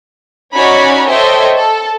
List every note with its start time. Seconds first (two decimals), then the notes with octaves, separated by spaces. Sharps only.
0.54 C#4 D#4 F#4 C#5 D5 B5
1.08 A4 C5 C#5 D#5 E5 G5
1.57 A4